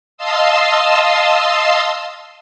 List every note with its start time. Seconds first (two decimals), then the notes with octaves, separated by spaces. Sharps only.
0.17 D#5 F5 A5 C6 D#6 E6